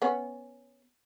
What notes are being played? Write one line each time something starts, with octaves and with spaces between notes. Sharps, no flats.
B3 C#4